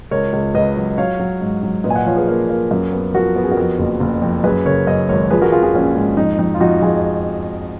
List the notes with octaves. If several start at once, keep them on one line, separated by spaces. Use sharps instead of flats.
C#2 A#4 C#5
C#2
C#2 B4 D#5
F#3
F#3 C#5 F5
F#3
G#2
F#3
A#2 B4 D#5
G#5
D#5 F#5
F3 C#5 F5
G#4 B4
A#3
A#3
F#2
B3
F3 F#4 A#4
B3 A#4
G#4
F#4 A#4
F2
F#1
F#1
F2
F#2 G#4 B4
C#3 A#4 C#5
F#2 B4 D#5
G#1 A#4 C#5
F3 G#4 B4
F#4 A#4
F3 F4 G#4
F4 G#4
A#1 C#4 F4
G#2
F2 D#4
F2 D#4
F4
F2 D#4 F#4
F2 F4 G#4